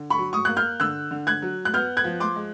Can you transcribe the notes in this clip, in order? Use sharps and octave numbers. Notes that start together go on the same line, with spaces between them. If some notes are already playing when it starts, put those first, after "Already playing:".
Already playing: D3
B5 C#6
F#3
C#6 D#6
A#3 F#6
F6 G6
D3 E6 F#6
D3
F#6 G#6
F#3
F#6
B3 F6 G6
F#6 G#6
F3
C6 D6
G#3